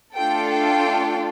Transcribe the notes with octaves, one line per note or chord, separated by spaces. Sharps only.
A3 D4 F4 A4 G5
G5